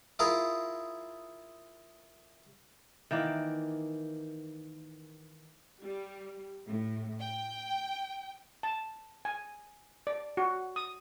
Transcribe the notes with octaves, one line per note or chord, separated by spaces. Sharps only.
E4 F4 G#4 A#4
D#3 E3 A#3 D5
G3
A2
G5
A5
G#5
D5
F#4
D#6